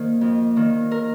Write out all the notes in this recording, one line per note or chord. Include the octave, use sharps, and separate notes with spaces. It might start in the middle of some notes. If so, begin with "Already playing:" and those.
Already playing: D#3 A#3 C5
F2
D#3 A#3
A#4